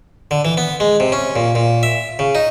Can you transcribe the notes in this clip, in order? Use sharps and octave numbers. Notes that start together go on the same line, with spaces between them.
D3
E3
B3
G#3
C3
C#4
A#2
A#2
E5
C#3
D#4